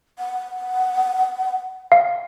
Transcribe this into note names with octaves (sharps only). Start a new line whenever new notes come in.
F#5
F5